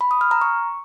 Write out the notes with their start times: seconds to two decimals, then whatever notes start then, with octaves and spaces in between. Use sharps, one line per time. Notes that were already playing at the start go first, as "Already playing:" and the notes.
0.01 B5
0.11 D#6
0.21 F6
0.31 A#5
0.41 C#6